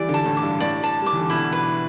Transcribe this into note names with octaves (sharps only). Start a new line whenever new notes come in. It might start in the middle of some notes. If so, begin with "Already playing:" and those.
Already playing: E3 G3 D5
D3
A5
A2
D6
G2
A2 D5
A5
G3
D6
E3
D3
B2 E4
B4